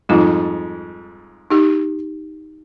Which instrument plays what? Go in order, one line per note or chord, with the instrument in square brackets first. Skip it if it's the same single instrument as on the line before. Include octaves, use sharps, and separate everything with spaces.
[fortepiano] F2 G#2 [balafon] G3 F4
[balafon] D#4 G4